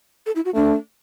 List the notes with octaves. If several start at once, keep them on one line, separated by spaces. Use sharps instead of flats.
A4
E4
F#4
A3 D4